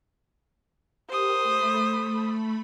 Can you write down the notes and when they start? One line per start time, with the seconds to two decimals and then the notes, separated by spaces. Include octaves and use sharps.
1.10 G4 A#4 C5 D#6
1.43 A3 B5